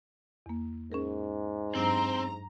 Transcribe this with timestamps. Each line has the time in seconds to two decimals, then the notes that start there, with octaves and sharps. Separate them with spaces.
0.46 E2 A#3
0.92 G#2 C#4 G#4 A#4
1.75 G2 F#3 C4 D4 A#5